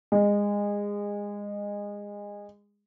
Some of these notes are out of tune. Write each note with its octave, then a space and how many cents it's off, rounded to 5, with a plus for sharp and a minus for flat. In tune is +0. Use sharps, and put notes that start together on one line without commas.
G#3 -25